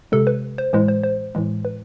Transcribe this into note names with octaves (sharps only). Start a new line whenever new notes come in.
C3 G#3 A4
B4
C5
A2 E3 G#3 C5
C5
C5
A2 E3 G#3
B4